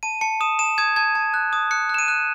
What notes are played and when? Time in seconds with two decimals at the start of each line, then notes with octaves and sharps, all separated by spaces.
0.03 A5 D#7
0.21 A5 C#7
0.41 D#6 E7
0.59 A5 E7
0.78 D#6 G#6
0.96 A5 G#6
1.15 A5
1.34 F#6
1.53 D#6
1.71 F#6 C#7
1.89 F#6 E7
1.98 D#7
2.08 F#6